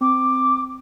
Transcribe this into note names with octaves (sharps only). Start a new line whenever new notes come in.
C4 D6